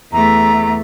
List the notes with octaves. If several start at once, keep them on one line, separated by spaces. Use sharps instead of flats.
E2 A3 A#5